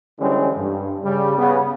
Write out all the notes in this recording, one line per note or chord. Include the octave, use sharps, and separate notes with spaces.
D3 E3 G3 G#3 C4 C#4
G2
C#3 G3
C#3 B3